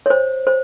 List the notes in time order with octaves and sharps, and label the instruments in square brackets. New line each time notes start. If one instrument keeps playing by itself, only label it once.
[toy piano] C#5
C5
C5